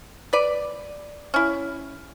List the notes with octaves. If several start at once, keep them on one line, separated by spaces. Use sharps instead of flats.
B4 D5
C#4 E4